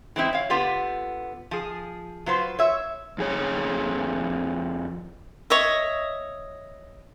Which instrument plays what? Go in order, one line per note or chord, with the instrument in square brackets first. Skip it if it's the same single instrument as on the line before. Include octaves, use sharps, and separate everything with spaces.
[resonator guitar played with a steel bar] E3 G#3 C4 E4
C#5 F5
D3 B3 F4 G4
F3 G#4
F#3 F4 B4 C5
C#5 E5
[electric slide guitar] F2 G#4 C#5
[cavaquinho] C#5 D#5 E5